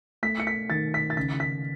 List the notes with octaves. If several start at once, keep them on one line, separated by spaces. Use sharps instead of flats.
A3 B6
C#7
B6
D#3 A6
B6
A6
C#3 B6
B6